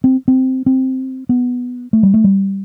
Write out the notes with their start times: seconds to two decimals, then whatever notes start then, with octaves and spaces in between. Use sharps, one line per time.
0.04 C4
0.28 C4
0.66 C4
1.29 B3
1.93 A3
2.03 G3
2.14 A3
2.24 G3